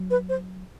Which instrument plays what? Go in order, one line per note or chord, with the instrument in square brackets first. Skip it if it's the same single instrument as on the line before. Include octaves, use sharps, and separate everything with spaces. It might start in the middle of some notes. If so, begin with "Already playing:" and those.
Already playing: [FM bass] F#3
[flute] B4
C5